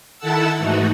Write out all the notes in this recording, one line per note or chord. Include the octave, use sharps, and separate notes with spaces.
D#3 E4 A4 F#5 A5 E6
G#2 E3 A3 D#4 F#4